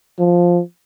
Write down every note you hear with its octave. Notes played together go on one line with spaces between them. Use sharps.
F3